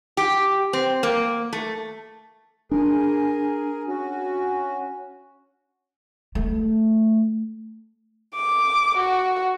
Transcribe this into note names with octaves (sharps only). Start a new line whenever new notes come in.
G4
C4
A#3
A3
D4 G#4 A#4
C#4 F#4
A3
D6
F#4